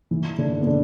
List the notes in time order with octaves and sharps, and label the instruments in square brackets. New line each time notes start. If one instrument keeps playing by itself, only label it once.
[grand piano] E3 E4
D3 D4
B3
D3 D4